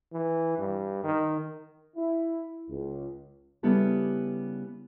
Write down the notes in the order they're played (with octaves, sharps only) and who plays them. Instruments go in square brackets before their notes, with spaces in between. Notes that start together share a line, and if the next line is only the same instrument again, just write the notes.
[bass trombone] E3
G2
D#3
[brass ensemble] E4
C#2
[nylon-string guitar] C#3 G3 B3 E4 G4 A4